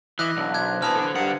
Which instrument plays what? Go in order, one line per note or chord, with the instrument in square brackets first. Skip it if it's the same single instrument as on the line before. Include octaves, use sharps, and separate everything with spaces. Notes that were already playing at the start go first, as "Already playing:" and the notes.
[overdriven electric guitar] E3 [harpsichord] E4 D#5 D6 [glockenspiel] F#6
[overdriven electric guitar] B1 [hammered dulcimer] D3 F#3 A4
[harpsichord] D4 [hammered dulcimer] A#4 C5 [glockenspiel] F#6 G#6
[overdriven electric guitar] A#2 A5 [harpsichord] E3 B3 [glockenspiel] F6
[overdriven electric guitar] D4 A4 [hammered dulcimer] D6
[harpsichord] G2 D#3 [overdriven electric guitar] D3 F#5 [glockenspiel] C#7